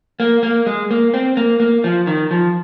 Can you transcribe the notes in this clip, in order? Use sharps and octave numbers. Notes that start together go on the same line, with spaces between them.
A#3
A#3
G#3
A#3
C4
A#3
A#3
F3
D#3
F3